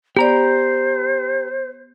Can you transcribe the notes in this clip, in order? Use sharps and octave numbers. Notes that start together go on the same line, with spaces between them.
B3 G4 C5 D5 A#5